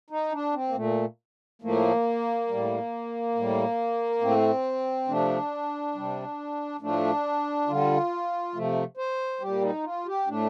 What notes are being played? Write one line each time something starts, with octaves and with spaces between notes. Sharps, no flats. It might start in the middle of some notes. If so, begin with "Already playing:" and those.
D#4
D4
C4
A#3
A#2 A3
A2 F3 A3 A#3
A2 G3
A2 G3
A2 A3 C4
C3 F3 A3 D4
C3 G3
A2 F3 A3 D4
D3 G3 F4
C3 F3 A3
C5
A#2 G3 G4
D#4
F4
G4
A2 A3 D4